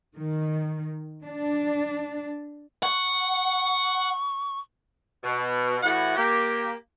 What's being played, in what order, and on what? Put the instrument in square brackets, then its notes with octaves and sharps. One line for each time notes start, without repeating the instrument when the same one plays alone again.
[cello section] D#3
D4
[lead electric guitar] F#5 [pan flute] C#6
[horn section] B2
A2 E3 E4 F#4 F#5
A#3 G4